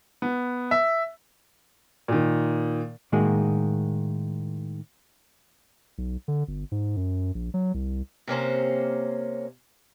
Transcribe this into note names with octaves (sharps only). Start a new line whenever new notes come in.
B3
E5
A#2 D#3
A2 D#3 G#3 A#3 F#4 G#4
B1
D3
G1
G#2
F#2
A#1
F#3
C2
C3 A#3 C#4 C5